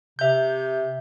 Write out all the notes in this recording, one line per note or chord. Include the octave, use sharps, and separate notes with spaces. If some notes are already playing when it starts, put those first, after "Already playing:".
C3 E5 G6